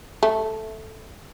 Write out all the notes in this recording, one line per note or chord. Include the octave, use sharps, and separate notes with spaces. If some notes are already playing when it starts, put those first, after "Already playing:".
A3